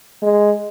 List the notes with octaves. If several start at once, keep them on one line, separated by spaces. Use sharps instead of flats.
G#3